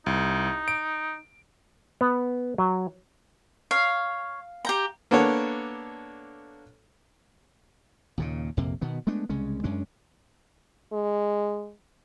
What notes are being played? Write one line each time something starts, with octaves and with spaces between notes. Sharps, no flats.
C2 D#4
D7
B3
F#3
C#5 F5
G4 G5 A#5
A#3 B3 D4 A4 C#5
D#2 A#2 C#3
A#1 F2 C3 A#3
B2 D#3 B3
G#3 A3 B3 D4
C2 C#3 G#3 C#4
F#2 G#3 C#4 D4
G#3